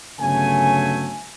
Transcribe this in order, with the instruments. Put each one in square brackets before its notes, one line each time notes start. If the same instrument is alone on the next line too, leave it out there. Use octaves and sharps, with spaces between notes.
[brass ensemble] G1 C#3 F#3 A3 G#5